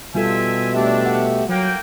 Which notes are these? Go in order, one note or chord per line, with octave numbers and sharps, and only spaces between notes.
B2 G3 F4 A4 E5 G5 G#5
A3 D4 G4 E5
F#5
F#3 A#3 G5